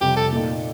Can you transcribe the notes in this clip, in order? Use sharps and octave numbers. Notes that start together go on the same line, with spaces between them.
F2 C3 G3 G4
A4
A#2 A3 D#4